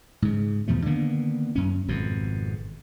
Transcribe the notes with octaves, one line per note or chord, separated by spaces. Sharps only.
G#2 C#3
E2 B2 F3 A3
D3 D#3 A#3 B3
F#2 C#4
G#1 F2 B2